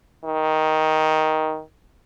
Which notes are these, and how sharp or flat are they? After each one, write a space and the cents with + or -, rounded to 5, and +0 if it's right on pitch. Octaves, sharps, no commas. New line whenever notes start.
D#3 +10